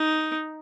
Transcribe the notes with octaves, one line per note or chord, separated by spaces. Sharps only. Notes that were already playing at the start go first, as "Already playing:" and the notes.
Already playing: D#4